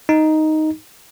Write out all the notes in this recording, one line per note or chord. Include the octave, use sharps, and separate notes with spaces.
D#4